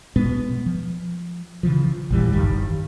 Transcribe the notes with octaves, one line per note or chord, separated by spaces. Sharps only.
B2 G#3 B3
F3
C#3 E3 F3
A#1 E2 E3 G3
F#1 G2 D#3 G3